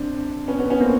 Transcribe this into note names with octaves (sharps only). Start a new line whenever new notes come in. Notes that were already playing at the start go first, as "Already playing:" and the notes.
Already playing: C4 D4
B3 C#4
B3 C#4
B3 C#4
A#3 C4